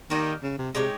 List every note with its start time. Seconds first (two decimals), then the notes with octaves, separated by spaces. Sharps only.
0.10 D#3 A#3 D#4 G4 A#4
0.43 C#3
0.59 C3
0.75 C3 G#3 D#4 G4 C#5